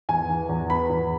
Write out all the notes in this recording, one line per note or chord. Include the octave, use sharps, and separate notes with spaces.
E2 G#5
E3
E2
B3 B5
E2